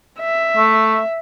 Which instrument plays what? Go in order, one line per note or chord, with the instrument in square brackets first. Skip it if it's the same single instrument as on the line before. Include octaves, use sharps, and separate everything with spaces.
[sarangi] E5
[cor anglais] A3